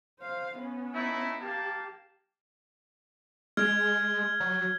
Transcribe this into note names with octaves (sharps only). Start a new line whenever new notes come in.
C5 F5
B3 C#4
A3 D#4 E4
A#3 G4 F5 A5
G#3 F6 G#6
F#3